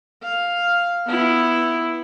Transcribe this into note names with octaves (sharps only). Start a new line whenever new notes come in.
F5
B3 E4